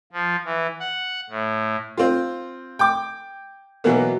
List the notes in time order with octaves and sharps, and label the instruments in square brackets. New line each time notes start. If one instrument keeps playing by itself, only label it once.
[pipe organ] F3
E3
F#5
A2
[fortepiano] C4 F4
G5 D6
B2 E3 F#3 A#3 B3